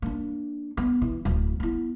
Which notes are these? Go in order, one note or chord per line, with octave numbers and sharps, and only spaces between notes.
A#3 D4
B3
E3
D1 F#3
B3 E4